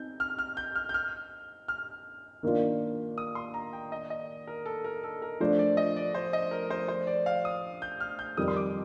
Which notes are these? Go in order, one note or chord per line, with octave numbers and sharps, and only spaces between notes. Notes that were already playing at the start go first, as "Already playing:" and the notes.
Already playing: C4 D#4 G6
F6
F6
G6
F6
G6
F6
F6
D#3 A#3 D4 F4
D#6
C6
A#5
G5
D#5
D#5
A#4
A4
A#4
A4
A#4
F3 A3 D4 C5
D5
D#5
D5
C5
D#5
A#4
C5
C5
D5
F5
D#6
G6
F6
G6
F2 D#3 G3 D#6
C6
D6